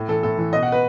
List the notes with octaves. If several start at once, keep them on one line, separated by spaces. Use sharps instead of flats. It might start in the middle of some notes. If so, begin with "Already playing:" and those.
Already playing: A2
E3 A4
A2 A4
E3
B2 D#5
F#5
B4